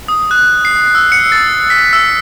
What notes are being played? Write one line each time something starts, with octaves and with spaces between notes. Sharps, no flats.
D#6
F#6
C7
E6
C#7
A6
B6
E6